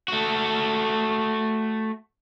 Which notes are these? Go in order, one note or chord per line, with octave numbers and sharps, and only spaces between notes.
A3 F#4